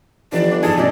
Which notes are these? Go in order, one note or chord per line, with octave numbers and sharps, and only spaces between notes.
G1 E3 F3 E4 D5
D4
G2 F3 D#4 G#4 A5
A1 B2 G4 A4 D5 D#5